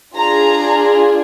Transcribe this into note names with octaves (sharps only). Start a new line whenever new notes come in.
D4 F4 G#4 A#5